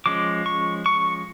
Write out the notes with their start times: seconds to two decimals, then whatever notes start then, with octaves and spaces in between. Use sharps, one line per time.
0.06 F3 G#3 C#4 D6
0.46 C#6
0.86 C#6